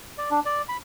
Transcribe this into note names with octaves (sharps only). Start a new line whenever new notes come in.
D5
D4
D5
B5